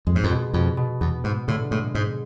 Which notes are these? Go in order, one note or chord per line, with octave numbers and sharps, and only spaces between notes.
F2 G#3
G#2
F2
B2
F2 B2
B2
E2 B3
G#2 B3
A2 D3
A2 G#3
G#2 G#3